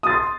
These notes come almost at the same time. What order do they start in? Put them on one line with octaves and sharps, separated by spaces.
D#6 A6 C6